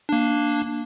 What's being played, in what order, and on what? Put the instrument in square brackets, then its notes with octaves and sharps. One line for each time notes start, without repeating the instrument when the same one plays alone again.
[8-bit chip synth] A#3 D4